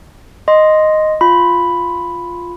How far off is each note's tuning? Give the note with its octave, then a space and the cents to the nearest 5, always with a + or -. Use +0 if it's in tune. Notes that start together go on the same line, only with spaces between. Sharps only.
D#5 +0 C6 +0
F4 +0 B5 +0